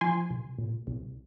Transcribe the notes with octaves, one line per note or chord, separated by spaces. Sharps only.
F3 G#5 C6
C2
A#2
C2